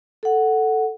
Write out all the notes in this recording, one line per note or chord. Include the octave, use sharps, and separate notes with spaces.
A4 F#5